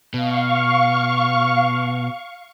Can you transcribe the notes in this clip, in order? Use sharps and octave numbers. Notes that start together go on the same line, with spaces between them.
B2 F5 C#6